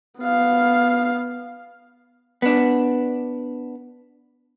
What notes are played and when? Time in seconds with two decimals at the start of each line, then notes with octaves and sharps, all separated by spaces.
0.20 B3 F5
2.42 B3 D4